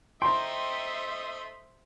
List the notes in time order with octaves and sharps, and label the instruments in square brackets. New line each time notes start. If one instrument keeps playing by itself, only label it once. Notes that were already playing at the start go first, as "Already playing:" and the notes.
[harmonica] A3 D#4 D#6 [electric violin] C5 E5 [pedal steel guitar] G5 A#5 [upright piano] C6